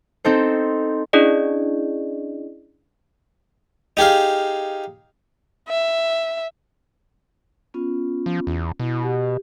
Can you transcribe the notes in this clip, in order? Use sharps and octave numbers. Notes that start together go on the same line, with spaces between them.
C4 D#4 A4 C5
C#4 D4 E4 G#4 D5 D#5
D#4 G4 G#4 F5
E5
B3 C#4 F4
F3
E2
B2 E4
G4